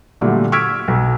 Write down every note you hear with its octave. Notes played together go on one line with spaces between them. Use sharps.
A#2 D3 F#3 G3 A3
C#6 E6 F6 G#6 B6 D7
B1